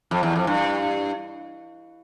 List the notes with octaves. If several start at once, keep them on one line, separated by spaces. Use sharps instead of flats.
F2
E2
F2
G2